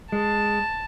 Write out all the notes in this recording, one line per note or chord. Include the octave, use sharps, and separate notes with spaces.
G#3 A5